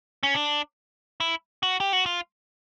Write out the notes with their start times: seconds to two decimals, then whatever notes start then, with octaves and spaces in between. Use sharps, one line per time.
0.23 C#4
0.35 D4
1.20 E4
1.63 F#4
1.80 G4
1.93 F#4
2.06 F4